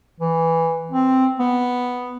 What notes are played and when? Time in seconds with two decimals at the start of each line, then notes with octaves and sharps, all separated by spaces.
0.20 E3
0.91 C4
1.39 B3